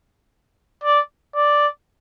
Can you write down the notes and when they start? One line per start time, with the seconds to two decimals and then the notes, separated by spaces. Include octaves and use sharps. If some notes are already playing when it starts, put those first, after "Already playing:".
0.84 D5
1.35 D5